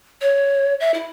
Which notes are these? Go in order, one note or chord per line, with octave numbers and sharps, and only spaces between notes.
C#5
E5
E4